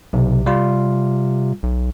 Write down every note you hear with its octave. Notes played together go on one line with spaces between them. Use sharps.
B1 C3
G3 F4
B1